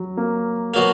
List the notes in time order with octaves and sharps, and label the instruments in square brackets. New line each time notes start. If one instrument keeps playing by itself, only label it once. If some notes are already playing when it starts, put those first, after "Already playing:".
Already playing: [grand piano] F#3
A#3
[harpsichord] B2 F#3 A#3